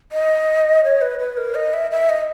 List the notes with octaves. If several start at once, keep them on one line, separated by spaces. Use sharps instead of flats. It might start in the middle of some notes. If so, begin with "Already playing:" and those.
D#5
C#5
B4
B4
A#4
D#5
E5
E5
D#5